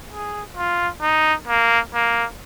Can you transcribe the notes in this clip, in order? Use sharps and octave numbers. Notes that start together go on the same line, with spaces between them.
G#4
F4
D#4
A#3
A#3